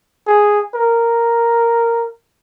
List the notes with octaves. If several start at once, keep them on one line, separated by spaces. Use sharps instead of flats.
G#4
A#4